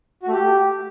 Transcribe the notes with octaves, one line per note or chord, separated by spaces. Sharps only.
F#4
A3
G4